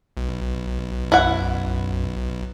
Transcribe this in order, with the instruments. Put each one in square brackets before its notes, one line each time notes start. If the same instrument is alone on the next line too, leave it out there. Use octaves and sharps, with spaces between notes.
[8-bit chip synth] B1
[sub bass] F#2 [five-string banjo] E4 F#5